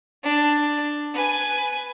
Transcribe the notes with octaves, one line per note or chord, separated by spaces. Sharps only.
D4
B4 G#5